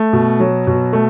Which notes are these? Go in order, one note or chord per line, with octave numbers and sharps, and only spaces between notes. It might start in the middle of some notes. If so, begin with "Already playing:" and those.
Already playing: A3
B2
F#3
B2
A3